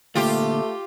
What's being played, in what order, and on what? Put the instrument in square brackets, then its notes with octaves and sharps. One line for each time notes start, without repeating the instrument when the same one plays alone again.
[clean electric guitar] D2 A#2 [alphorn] A3 [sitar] F4 G4